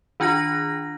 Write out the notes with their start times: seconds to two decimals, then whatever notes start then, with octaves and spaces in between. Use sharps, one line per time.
0.20 D#3 D4 F4 F#6 A#6